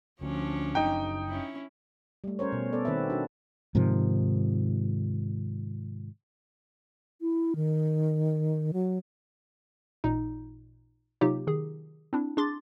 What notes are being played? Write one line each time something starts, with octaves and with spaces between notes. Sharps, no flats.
D2 D3 F3 C#4 D4
F#1 D#4 G5
C#4 E4
G3 A3
C#4 A#4 C5 C#5
B2
B3 A4 D5
D#3 C4 B4 E5
D4 F#4
G#2 C3 D#3 F3
E4
D#3
F#3
A1 A#2 D#4
C3 F#3 A#3 D#4 F4 G4
D#3 G#4
C4 D4 E4
D4 G#4 C6 D6 A6